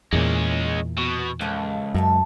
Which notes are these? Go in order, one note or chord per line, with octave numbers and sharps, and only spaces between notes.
E2 A#2 G#3 C#4
B2
C#2 F3 A3 A#3
F#2 A4 E5 A5